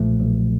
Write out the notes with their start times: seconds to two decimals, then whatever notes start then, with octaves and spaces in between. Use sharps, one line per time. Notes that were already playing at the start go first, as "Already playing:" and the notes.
Already playing: B1 A#2 F3 A3
0.19 B1